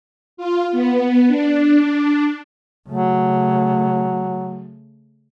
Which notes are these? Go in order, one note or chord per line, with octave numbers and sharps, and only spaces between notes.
F4
B3
D4
C#3 F#3 A3